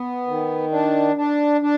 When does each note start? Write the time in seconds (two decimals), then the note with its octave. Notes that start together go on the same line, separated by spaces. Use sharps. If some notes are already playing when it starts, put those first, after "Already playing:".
Already playing: B3
0.27 D#3
0.71 D4
1.16 D4
1.61 D4